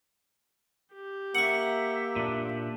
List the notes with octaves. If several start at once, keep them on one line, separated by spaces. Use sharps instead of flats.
G4
A#3 E5 F#5 C#6
A#2 D4